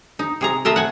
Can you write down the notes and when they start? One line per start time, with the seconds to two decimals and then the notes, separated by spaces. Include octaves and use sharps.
0.19 D#4
0.41 C3 G#4 A#5
0.65 A3 F4 A#4 D#5 E5 A5
0.76 F#5 G#5